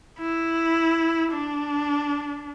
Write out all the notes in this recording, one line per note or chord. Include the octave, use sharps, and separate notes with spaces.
E4
D4